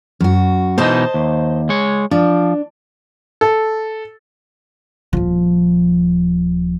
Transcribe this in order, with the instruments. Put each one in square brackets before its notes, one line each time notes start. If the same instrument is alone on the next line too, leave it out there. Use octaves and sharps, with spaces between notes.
[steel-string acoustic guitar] F#2 F#4
[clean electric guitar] B2 E3 D#4 [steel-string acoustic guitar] C5 D#5 A5
[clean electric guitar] D#2
G#3 C#5
[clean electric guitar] F3 [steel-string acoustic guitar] D4
[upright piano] A4
[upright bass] D#1 F3